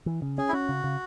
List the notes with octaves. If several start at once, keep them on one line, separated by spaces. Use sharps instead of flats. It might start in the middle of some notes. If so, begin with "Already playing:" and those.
E3
C#3
C#4 G#4
E4
C#4 F#4
C#3
C#3